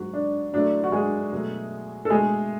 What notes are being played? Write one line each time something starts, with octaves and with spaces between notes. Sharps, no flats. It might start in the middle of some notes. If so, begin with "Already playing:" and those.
Already playing: G#2 F#3 G#3 F#4
D4
A2 F#3 A3 D4
F#4
G#3 G#4
B2 F#3 A3
A4
B2 G#3 A3 G#4